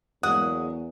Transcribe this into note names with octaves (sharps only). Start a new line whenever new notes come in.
E2 F#3 G#3 A#3 F#5 D#6